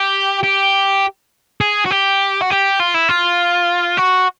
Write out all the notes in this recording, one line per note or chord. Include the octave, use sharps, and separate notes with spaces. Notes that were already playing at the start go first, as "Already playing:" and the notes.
Already playing: G4
G4
G#4
F#4
G4
F#4
G4
F4
E4
F4
F#4